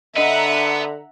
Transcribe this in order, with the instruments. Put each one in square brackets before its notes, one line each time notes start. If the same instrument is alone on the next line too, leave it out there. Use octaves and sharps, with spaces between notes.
[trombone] D3 [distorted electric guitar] B3 [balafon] D4 D#5 [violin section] E5 F#5 A#5